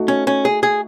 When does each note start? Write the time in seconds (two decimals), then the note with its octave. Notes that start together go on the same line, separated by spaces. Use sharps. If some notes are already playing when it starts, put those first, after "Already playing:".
Already playing: A3 D#4 F#4
0.08 C#4
0.27 C#4
0.45 G#4
0.63 G#4